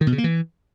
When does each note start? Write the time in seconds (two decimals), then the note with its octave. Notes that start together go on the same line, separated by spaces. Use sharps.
0.01 D#3
0.07 B2
0.12 C#3
0.18 A#3
0.24 E3